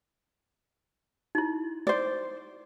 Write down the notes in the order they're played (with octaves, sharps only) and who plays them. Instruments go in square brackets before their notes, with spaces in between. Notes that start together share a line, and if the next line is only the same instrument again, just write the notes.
[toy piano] D#4 E4
[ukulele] C5 D5